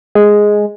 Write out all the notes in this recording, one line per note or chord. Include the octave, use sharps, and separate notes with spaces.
G#3